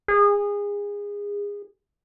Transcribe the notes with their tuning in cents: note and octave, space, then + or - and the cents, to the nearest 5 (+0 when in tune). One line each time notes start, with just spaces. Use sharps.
G#4 -25